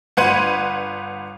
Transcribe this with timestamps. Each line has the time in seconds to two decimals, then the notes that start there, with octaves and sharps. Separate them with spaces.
0.17 G1 B4 F#5 C6 G#6 D#7